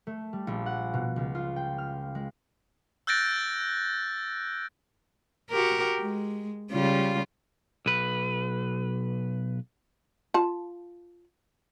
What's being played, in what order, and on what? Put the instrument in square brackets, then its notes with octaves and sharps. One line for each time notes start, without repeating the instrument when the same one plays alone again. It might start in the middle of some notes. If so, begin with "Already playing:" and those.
[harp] A3
G3
A#1
F#5
B2
C#2
F4
G5
F6
G#3
[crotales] E6 F#6 G6 A6 A#6 D7
[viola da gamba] F#4 G4 A#4
G#3
C#3 G3 F4
[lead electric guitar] B1 B4
[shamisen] F4 A5